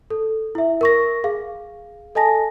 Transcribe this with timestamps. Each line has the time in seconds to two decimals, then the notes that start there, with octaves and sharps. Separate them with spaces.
0.10 A4
0.55 E4 E5
0.81 A#4 C#6 A#6
1.24 G#4 F5
2.15 A4 D#5 G#5 A5 A#6